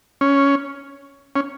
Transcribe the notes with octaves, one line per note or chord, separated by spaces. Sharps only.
C#4
C#4